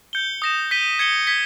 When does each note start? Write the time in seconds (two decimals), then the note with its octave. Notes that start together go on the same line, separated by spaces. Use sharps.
0.13 G6 C#7 G7
0.42 D#6 A#6 E7
0.71 G6 B6 D#7 G7
0.99 G#6 C#7 G7
1.27 G#6 B6 G7